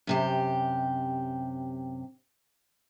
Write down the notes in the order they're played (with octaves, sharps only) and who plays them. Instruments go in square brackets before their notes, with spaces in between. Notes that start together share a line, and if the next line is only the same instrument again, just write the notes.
[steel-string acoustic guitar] F#2 C3 G4